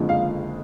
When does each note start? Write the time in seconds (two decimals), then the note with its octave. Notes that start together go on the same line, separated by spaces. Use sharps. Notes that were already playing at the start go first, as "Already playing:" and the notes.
Already playing: F#1 F2 D3 F3 G#3
0.09 F5